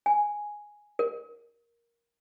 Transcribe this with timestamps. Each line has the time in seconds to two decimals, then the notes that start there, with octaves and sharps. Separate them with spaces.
0.06 G#5
0.99 A#4